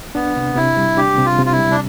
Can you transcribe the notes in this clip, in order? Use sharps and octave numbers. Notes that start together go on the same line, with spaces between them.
B3 D4
C3
C3 E4
G3
D4 G4
C3
F4
C3
F4
E4
G3
D4